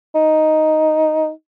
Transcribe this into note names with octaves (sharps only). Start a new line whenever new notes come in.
D#4